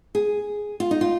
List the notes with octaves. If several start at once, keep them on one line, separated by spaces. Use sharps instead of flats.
G#4
F4
D#4
F4